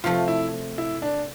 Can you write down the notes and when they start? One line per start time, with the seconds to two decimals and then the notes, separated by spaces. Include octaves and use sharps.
0.04 C3 F3 A3 F4
0.28 E4
0.78 E4
1.02 D4